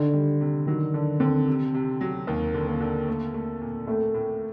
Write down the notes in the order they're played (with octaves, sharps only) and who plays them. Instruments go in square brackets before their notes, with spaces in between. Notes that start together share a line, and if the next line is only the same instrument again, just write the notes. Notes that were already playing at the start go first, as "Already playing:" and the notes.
Already playing: [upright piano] D3 [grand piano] D#3
[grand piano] G3
C3
[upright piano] D#3 [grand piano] F#3
[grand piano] D3 [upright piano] D4
[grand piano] D3 [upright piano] C4
[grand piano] C3
C3
F#3
[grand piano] D#2 [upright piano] A#3
[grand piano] D3
[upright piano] A#3
[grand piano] D3
[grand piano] A3 [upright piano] A#3
[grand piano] A3
A#2
[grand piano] A2 [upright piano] A3
[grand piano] A2